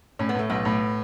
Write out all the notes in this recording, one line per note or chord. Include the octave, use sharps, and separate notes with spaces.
A2 C#4
B3
A2 A3
B1 B3
A2